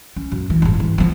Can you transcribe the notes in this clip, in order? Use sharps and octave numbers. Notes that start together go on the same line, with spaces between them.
C#4
F#2
E3
F#1 G#2
E3
F3 B3